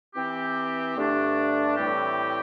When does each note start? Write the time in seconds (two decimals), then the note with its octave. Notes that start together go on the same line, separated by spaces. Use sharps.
0.15 E3 C4 G4
0.96 G2 D3 A3 D4 G4
1.76 A2 E3 G3 C4 G4